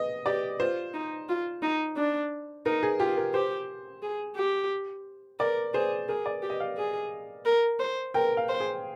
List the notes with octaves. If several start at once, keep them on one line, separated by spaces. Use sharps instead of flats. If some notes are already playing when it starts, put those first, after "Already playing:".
Already playing: D#5
G4 D5
F4 C5
D#4
F4
D#4
D4
D#4 A#4
G#4
F4 G4
A#4
G4 C5
G#4
G4
A#4 D5
G#4 C5
G#4 A#4
D5
G4
D#5
F5
G#4
A#4
C5
A#4 G5
F5
C5
G#4